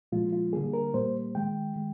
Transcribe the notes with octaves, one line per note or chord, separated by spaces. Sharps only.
A#2 F3 G#3 F4
F4
D3 G3 A#3 G#4
A#4
A#2 G3 A#3 C5
D#3 G#3 G5
D#3 G#3